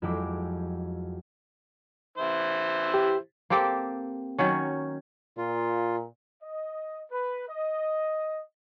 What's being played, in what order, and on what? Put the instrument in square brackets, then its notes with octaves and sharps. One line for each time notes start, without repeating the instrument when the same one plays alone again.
[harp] F2 F#3 G#3 E4 G5 D6
[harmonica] E3 E4 C5
[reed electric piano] G4
[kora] A#3 C4 G4 A4
D#3 F#3 C#4
[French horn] A#2 [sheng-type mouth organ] F4
[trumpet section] D#5
B4
D#5